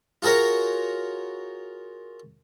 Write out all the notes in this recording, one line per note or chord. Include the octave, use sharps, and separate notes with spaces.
F4 F#4 G#4 A#4 C#5